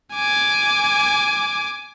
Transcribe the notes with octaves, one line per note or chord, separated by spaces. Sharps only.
G#5 D6